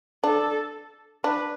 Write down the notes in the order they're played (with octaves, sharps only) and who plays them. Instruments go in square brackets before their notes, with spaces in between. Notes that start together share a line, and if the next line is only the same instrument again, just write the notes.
[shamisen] D4 [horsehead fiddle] A4
[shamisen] D4 [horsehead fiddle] B4